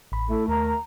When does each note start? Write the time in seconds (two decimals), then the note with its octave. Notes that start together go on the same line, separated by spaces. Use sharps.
0.12 A1 B5
0.29 A3 E4 A4
0.48 D#2 A#4 A#5